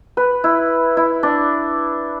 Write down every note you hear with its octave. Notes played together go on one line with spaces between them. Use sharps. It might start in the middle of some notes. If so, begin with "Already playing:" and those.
B4
E4
E4
D4